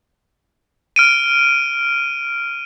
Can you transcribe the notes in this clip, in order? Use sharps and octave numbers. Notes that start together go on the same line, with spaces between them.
F6 D7 D#7